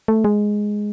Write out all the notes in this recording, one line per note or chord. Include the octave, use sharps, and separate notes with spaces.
A3
G#3